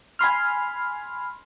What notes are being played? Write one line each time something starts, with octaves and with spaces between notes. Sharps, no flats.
G#5 B5 C6 F6